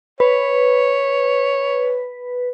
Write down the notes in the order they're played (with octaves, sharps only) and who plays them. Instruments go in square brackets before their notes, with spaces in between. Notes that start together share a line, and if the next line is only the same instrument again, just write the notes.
[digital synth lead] B4 [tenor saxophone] C#5